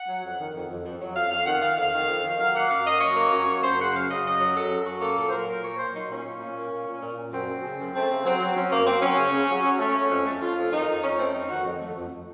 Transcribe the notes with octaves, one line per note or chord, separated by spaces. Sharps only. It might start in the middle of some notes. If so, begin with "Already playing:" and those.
Already playing: F#5
F#3
F2
D#3
F2
F2
F2
F#3
F2 F5
F2 F5
D#3 F#5
D#3 F5
F2 F5
D#3
F2
D#3
F#3 F5
A#3 F#5
F#2 F5
F#2 D#5
F#3 C#5
A#3
F#2
F#2
F#2 C5
C#3 F#5
F#3 F5
C#3 D#5
F#2 D#5
F#3
F#2 A4
F#2
F#3 F#4
A#3 A4
A#2 A4
C5
F#3 A#4
A#2 A#4
A#3 C#5
A#3 C5
F#3 D#4
A#2 C#4
A#2
A#2
A#3
A#2
A#2
A#2
A#2
F#2 C4
F#2
C#3
F#2
A3 C4
C#3
F#3 C4
F#3
F#3 C#4
F#2 A#3
F#2 C4
F#3 C#4
C#3
C#3
F#3
F#3
A3 C#4
A3
F2
A3
F2 F4
F2
D#3 D#4
F2
F2 C#4
A3 C4
F2 D#4
D#3 F#4
F2
A3
F2